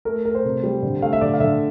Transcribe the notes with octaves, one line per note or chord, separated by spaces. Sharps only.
A3 A#4
A3 A#4
C5
C3
G3
D3
A3 F5
E5
D3 D5
F5
D3 E5